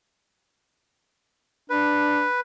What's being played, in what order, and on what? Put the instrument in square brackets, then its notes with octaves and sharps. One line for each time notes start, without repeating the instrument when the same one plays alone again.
[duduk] D4 [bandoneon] B4